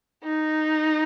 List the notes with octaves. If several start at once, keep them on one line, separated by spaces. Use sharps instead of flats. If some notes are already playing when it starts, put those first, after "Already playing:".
D#4